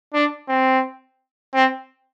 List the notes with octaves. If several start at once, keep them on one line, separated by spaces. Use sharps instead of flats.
D4
C4
C4